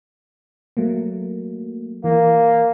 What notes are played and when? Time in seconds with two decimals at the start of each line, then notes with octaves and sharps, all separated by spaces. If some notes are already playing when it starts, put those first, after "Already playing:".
0.77 F#3 A3 A#3
2.04 E3 A#3